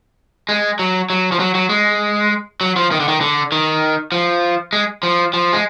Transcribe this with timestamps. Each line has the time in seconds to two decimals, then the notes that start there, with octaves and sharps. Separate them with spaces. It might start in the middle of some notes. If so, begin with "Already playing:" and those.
0.49 G#3
0.79 F#3
1.10 F#3
1.32 F3
1.40 F#3
1.55 F#3
1.69 G#3
2.61 F#3
2.76 F3
2.91 D#3
3.00 D3
3.08 D#3
3.21 D3
3.52 D#3
4.12 F3
4.73 G#3
5.03 F3
5.33 F3
5.53 G#3